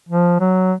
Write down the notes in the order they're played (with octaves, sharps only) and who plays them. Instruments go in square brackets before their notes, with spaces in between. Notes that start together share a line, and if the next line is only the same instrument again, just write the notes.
[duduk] F3
F#3